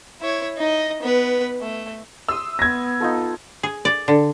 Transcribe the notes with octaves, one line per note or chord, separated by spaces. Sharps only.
E4 C#5
D#4 D#5
B3 B4
A3
E5 C6 D#6 E6
B3 G#6 A#6
D#4 F4 A4
G#4
D5
D3